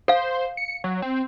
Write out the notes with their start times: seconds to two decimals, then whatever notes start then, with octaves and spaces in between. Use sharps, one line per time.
0.08 A4 C5 F5
0.57 C#7
0.84 F#3
1.02 C4